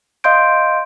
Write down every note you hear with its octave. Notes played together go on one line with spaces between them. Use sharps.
D#5 F5 C6 G6 D7